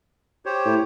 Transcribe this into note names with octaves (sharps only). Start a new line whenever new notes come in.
G4 C5 C#5
A2